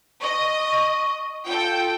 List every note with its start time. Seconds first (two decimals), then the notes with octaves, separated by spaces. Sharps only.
0.22 D#5 C#6
1.46 F4 A4 G5